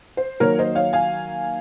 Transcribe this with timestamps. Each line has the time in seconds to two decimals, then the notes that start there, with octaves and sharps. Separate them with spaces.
0.17 C5
0.40 D#3 F#3 A#3 A#4 C#5
0.59 C5 D#5
0.75 C#5 F5
0.93 F5 G#5